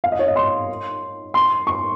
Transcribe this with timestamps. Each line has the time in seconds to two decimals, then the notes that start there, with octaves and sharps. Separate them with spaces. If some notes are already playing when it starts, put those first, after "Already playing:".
0.04 F5
0.12 D#5
0.19 C#5
0.28 D#5
0.36 C6
1.34 C6
1.67 C#6